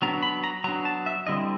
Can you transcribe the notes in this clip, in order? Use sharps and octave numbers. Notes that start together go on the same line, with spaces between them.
F#3 B3 D4 A#5
B5
A#5
F#3 B3 D4 A#5
A5
E5
D3 G3 C4 E4 D#5